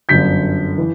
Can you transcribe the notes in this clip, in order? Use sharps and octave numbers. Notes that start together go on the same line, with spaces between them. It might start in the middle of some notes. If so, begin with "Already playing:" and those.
G1 F#2 D3 G6 B6
E3